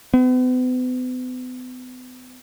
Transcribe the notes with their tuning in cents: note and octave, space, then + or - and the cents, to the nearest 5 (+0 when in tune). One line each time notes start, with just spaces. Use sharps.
B3 +40